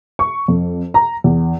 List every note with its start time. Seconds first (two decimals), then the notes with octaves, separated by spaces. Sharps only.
0.19 C#6
0.48 F2
0.94 A#5
1.24 E2